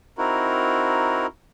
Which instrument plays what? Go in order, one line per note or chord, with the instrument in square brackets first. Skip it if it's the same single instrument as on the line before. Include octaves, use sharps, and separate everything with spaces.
[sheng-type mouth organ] C4 D#4 E4 F#4 A#4